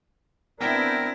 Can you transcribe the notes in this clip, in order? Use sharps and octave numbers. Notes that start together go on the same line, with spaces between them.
B3 C4 D4 E4 A#4 E5 G5